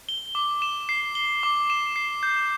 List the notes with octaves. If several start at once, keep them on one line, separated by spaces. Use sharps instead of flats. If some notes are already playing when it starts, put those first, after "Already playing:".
G7
D6
E7
C7
G7
D6
E7
C7
G6